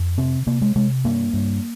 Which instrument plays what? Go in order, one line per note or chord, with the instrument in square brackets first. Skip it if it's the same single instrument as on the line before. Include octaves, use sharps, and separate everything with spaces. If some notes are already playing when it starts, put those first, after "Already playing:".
Already playing: [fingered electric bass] F2
C3 C4
C3 A#3
G#3
C3 G#3
G2 A#3
G2